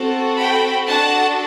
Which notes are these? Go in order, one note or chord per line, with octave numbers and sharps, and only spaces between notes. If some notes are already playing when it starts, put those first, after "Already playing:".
Already playing: C4 F#4 A4
G5 B5
D4 F#4 A4 F#5 A5